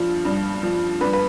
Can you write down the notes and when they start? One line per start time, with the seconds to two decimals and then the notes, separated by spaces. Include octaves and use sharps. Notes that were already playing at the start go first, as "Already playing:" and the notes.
Already playing: G2 F3
0.25 G2
0.63 F3
1.01 G2 B4
1.13 B4